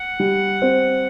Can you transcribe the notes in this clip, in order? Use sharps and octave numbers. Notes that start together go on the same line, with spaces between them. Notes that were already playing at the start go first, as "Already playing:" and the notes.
Already playing: F#5
G3
C4